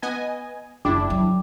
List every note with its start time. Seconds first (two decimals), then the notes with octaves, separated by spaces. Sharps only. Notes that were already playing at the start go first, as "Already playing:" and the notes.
0.02 B3 D#5 G#5
0.85 F#1 D4 E4 G#4 G5 D6
1.10 F#3